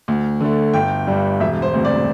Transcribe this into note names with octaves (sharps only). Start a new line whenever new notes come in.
D2
D3 A3
G1 G5
G2 G3
E1 E5
C5
D2 C3
D5